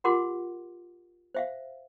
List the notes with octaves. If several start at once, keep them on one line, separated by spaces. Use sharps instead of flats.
F4 G4 A#4 F#5 C6 D6
C5 E5 F5